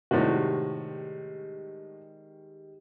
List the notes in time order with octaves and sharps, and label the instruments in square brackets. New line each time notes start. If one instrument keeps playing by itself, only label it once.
[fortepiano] A2 C3 F#4 [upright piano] D#3 G3 G#3